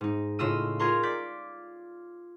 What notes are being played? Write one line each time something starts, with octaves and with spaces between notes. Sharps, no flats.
G#2 D#4
A2 C#3 F4 D#5 E6 D#7
F4 G#4 A#4 C#5 A#5 C6
D5 G6 B6